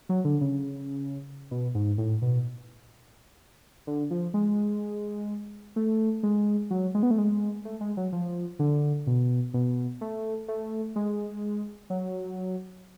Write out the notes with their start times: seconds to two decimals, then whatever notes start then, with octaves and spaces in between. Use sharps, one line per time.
0.09 F#3
0.25 D3
0.41 C#3
1.51 B2
1.75 G#2
1.98 A2
2.22 B2
3.87 D3
4.11 F3
4.34 G#3
5.76 A3
6.23 G#3
6.70 F#3
6.95 G#3
7.03 B3
7.11 A3
7.18 G#3
7.65 A3
7.81 G#3
7.97 F#3
8.12 F3
8.59 D3
9.07 B2
9.54 B2
10.01 A3
10.48 A3
10.96 G#3
11.90 F#3